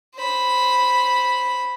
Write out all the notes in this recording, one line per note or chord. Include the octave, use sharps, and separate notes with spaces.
C5 B5